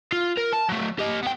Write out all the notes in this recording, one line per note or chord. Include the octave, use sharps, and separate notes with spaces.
F4
A#4
A5
F#3 A3
G4 D#5
B3 G5